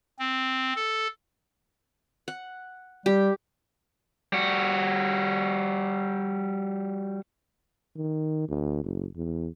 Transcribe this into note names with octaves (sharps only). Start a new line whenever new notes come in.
C4
A4
F#5
G3 G4
G3 F#4
D#3
D2
F#1
E2